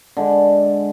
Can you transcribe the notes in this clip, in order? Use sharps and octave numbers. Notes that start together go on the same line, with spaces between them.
D3 G#3